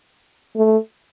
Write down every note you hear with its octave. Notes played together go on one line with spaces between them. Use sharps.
A3